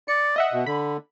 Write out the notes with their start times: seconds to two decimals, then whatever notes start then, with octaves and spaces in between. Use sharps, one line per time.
0.08 D5 C#7
0.36 D#5 E5 F#5
0.53 B2
0.66 D3 B5